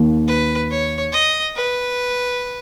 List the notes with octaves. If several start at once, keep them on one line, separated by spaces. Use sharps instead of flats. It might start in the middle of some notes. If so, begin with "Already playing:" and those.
Already playing: D#2 D#3 A#3
B4
C#5
D#5
B4